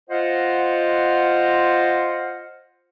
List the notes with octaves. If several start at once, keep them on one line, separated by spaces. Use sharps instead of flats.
F4 C5 D#5 F#5